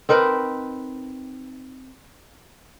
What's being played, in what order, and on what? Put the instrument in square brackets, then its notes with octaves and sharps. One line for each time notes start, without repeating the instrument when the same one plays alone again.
[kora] C4 D#4 A#4 B4